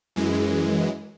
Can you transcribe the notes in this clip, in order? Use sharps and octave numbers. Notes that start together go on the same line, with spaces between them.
F#2 E3 G#3